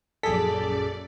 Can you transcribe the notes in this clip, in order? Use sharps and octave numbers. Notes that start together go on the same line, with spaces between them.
A#1 F#2 G#4 A4 D5 B6